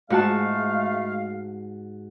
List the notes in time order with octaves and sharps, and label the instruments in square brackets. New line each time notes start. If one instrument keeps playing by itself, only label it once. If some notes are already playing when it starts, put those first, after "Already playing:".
[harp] G#2 F#4 A5 [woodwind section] G#3 A3 F5